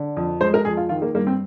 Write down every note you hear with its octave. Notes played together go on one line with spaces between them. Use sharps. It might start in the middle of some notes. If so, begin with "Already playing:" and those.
Already playing: D3
F2
G#3 C5
A#4
F2 G#4
F4
D#3 F4
A#3
G2 A#3
C4